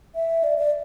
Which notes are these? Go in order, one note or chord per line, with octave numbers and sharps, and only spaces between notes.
E5
D5
D5